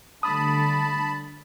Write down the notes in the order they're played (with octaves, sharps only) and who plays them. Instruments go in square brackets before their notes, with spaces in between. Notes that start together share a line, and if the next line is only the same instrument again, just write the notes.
[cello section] D3 G3 A3 [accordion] A5 B5 [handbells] D#6